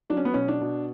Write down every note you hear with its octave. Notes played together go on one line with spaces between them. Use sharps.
F#3 D4
C#4
B3
B2 C#4
D4
B2